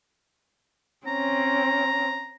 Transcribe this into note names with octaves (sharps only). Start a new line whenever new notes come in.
C4 C#4 A#5